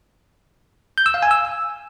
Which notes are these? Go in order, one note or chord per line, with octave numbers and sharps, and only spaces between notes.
G6
E6
F5
G#5
E6